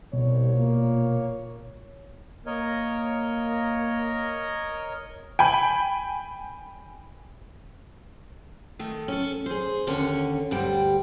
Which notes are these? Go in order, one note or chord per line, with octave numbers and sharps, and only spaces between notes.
C2 B2 C#5
A#2 A#3
A#3 A#4 C#5 D#5
G5 G#5 B5
D#3 A3
C#4 A4
G#4 C5
D#2 D3 C#4 C#5
D2 G2 G3 G5